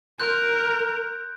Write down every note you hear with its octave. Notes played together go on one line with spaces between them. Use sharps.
A#4 C6 F#6 G6